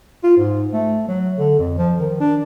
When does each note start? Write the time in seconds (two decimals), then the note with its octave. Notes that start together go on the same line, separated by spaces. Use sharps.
0.24 F4
0.37 G#2
0.73 A3
1.08 F#3
1.38 D3
1.59 F2
1.78 F3
2.00 D#3
2.21 D4